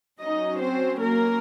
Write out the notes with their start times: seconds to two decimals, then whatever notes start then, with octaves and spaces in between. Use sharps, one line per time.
0.20 F#3 C#4 D#4 D#5
0.60 C4 C5
1.00 A#3 A#4